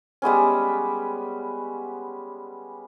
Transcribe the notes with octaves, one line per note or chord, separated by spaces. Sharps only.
G3 G#3 B3 C#4